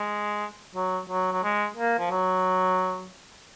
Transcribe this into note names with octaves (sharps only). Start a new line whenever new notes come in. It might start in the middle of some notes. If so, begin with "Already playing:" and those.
Already playing: G#3
F#3
F#3
F#3
G#3
A#3
F3
F#3